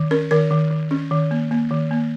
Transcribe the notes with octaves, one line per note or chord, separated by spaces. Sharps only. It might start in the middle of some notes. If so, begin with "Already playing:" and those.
Already playing: D#3
C#4 A#4
D#3 A#4
D#3
D#3
C#4
D#3
A#3
A#3
D#3
A#3